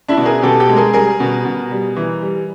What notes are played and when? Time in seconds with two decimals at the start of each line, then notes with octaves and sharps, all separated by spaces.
0.08 D4 E4
0.17 B2
0.25 G#4 A#4
0.43 B2 G4 A4
0.60 G4 A4
0.69 G#3
0.76 G#4 A#4
0.93 G3 G#4 A#4
1.20 B2
1.45 B2
1.71 G3
1.97 E3
2.22 G3